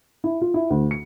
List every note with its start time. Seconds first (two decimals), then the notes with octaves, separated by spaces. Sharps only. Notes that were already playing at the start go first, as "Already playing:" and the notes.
0.24 E4
0.42 F4
0.54 E4
0.70 D2
0.91 C#7